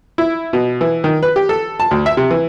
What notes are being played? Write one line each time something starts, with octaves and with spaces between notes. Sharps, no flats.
E4
B2
E3
D#3
B4
G4
A4
A5
D2
E5
C3
E3